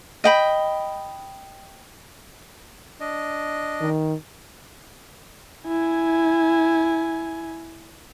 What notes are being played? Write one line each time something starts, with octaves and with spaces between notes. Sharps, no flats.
D#5 G5 B5
D4 D#5
D#3
E4 G#5